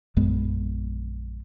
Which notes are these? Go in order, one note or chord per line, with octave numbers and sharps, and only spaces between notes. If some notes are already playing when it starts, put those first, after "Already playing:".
A#1 F#2 G#3 B3